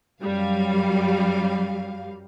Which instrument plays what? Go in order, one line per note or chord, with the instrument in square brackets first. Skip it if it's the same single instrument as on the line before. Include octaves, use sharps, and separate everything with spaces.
[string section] F#2 F#3 G3 F5